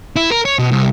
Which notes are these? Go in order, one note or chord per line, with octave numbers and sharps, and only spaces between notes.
E4
A#4
C#5
B2
C2